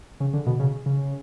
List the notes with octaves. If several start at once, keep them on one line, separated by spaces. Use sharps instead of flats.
C#3
D3
B2
C#3
C#3